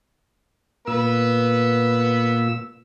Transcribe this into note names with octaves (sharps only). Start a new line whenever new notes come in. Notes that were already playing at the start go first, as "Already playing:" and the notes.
A#2 B3 B4 E6